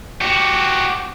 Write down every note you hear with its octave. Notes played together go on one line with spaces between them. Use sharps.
F#4 G4